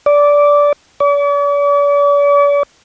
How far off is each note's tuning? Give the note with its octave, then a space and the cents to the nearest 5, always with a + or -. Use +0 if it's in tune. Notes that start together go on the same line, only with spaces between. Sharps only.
D5 -15
D5 -45